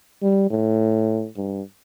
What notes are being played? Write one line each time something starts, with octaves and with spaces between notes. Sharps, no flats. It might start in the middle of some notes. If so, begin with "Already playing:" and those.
G3
A2
G2